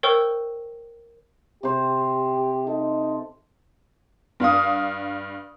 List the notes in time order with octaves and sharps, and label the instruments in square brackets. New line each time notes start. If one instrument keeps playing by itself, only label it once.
[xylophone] A#4 C5 C#5 G5 C#6 E6
[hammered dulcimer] C3 C5 [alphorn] G4
[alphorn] D#4 [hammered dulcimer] A4
[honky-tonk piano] G2 F5 D#6